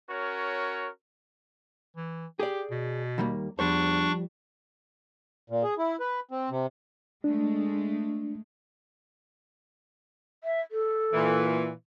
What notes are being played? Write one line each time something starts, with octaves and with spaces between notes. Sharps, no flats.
C#4 F#4 A#4 C#5
E3
G4 G#4 D5
B2
D#2 G3 A#3
E2 F3 G3 D4 C5 C#6
A#2
G#4
E4
B4
C4
C3
G#3 A3 D4
E5
A4
A#2 E3